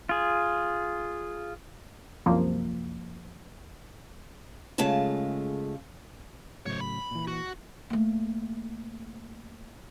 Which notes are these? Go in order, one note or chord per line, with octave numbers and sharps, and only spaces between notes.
F4 G#4
C2 F#2 F3 A#3
C#3 G#3 A3 F4 A5
A2 C#3 F#3 C5 C#5
B5
A#2 E3
F#4
A3 A#3